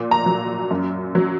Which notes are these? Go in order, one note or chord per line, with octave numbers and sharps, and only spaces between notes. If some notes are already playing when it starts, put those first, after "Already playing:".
Already playing: A#2
A#5
F#3
F#2
F#3